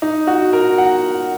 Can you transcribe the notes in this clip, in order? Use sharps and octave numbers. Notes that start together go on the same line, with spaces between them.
D#4
F#4
A#4
F#5